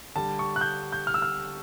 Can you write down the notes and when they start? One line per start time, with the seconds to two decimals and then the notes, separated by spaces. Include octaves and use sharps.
0.16 D3 G3 A5
0.39 C#6
0.56 F#6
0.61 G6
0.92 G6
1.07 F6
1.14 E6
1.22 F6